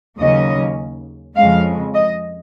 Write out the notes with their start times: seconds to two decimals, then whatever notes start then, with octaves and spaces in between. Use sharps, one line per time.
0.18 D#2 C#3 F#3 A#3 C#4 D#5
1.36 F2 C#3 G#3 F5
1.94 D#5